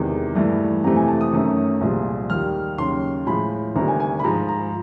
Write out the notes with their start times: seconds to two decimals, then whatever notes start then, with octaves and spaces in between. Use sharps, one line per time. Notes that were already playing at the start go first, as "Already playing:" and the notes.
Already playing: E2 C3 D#3 G#3
0.35 G2 E3 A3
0.84 F2 C3 E3 A3 A#5
0.96 G#5
1.08 A5
1.21 D#6
1.32 F#2 D#3 F#3 A3
1.81 C2 A#2 F3 G#3
2.30 D#2 D#3 G3 F6
2.78 D#2 C#3 F#3 C6
3.27 A2 F3 G#3 B5
3.76 D2 C3 D#3 G3 A#5
3.88 G#5
4.00 G#5
4.20 B5
4.24 G#2 F3 G#3 A#5
4.49 A#5